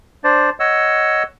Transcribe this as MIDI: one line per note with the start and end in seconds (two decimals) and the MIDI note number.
0.24 0.50 62
0.24 0.50 72
0.24 0.50 74
0.60 1.23 73
0.60 1.23 75
0.60 1.23 78
0.60 1.23 88